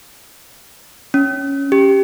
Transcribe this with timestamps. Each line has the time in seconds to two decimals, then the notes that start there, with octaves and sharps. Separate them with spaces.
1.14 C#4
1.72 G4